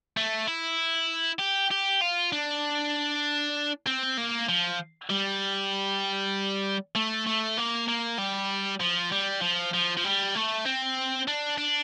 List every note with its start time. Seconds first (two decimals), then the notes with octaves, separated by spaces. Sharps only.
0.17 A3
0.48 E4
1.39 G4
1.71 G4
2.02 F4
2.33 D4
3.86 C4
4.17 A#3
4.49 F3
5.10 G3
6.95 A3
7.27 A3
7.58 A#3
7.88 A#3
8.18 G3
8.80 F3
9.12 G3
9.42 F3
9.74 F3
9.97 F3
10.04 G3
10.35 A3
10.65 C4
11.28 D4
11.58 D4